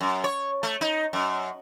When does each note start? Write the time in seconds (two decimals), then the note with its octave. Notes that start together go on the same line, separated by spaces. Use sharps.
0.01 F#2
0.24 C#5
0.63 A3
0.81 D#4
1.13 F#2